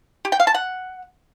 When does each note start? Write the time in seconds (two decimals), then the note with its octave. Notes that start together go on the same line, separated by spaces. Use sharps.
0.25 G4
0.32 G5
0.40 F5
0.47 A5
0.54 F#5